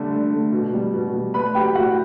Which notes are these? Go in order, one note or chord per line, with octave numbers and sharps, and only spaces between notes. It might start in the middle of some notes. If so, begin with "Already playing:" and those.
Already playing: D3 G3 A3
D3
A3
B2
G3
B2
G3
A3 B4 B5
F#3 G4 G5
A2 F#4 F#5